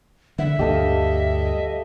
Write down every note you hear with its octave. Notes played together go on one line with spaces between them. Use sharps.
D3 E5 F#5
D2 G2 G4 A4 D#5 F5